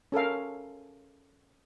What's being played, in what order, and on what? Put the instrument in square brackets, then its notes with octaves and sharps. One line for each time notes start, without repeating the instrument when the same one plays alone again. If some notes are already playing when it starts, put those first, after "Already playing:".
[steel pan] C#4 A4 A#4 F5